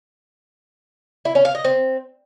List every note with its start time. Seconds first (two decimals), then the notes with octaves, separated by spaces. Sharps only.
1.25 E4
1.35 C#4
1.45 F5
1.55 D#5
1.64 C4